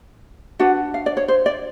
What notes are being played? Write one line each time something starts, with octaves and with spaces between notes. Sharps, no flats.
D4 F#4 B4 F#5
F5
D5
C#5
C5
D5